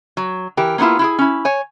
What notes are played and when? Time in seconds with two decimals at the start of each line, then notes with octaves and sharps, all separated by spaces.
0.17 F#3
0.57 E3 G4 A#4
0.78 A#3 B3 C#4 E4 F4
0.99 E4 F4 G#4
1.18 C#4 E4
1.45 C#5 G#5